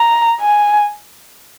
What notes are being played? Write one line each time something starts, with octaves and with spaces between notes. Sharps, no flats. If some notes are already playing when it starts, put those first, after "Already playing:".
Already playing: A#5
G#5